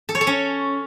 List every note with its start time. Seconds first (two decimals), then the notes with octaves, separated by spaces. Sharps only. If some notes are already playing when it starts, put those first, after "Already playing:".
0.09 A4
0.15 C#5
0.21 A4
0.27 C#4